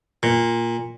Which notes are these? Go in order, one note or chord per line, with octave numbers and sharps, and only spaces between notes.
A#2